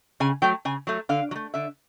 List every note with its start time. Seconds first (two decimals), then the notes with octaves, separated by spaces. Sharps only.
0.20 C#3 G#5
0.42 F#3 A3 G5
0.65 C#3 G#5
0.87 F#3 A3
1.09 D3 F5
1.31 F#3
1.35 A3
1.54 D3 E5